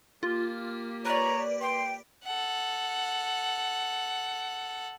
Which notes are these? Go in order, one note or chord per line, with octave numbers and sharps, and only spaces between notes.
A#3 F4 G4
B4 C#5 D5 A#5
G5 C6
A4 F#5